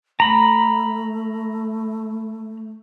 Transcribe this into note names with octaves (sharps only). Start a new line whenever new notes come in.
A3 A#5 B5